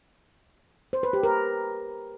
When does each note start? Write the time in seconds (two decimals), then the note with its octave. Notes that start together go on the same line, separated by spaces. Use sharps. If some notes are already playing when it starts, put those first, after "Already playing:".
0.93 C5
1.03 B4
1.13 G4
1.23 A#4